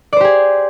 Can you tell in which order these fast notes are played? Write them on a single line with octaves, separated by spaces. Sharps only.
D5 C5 G4 G#4